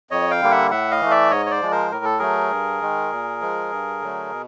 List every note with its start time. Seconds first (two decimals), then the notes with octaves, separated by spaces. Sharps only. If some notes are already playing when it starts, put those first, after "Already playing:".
0.11 F2 C#5 D#5
0.31 F5 G5
0.41 D3 G3 A#3
0.51 E5 F#5
0.71 A2 E5 F#5
0.91 D#5 F5
1.01 E3 A3
1.11 D5 E5
1.31 G#2 C#5 D#5
1.46 C#5
1.51 C5 D5
1.62 F3 G#3
1.71 A#4 C5
1.91 A2 A#4
2.05 A4
2.19 F#3 A3 G#4 A#4
2.51 G2
2.81 D#3 G#3
3.12 A#2
3.41 F3 G#3
3.72 G2
4.01 D3 F#3 A3
4.32 B2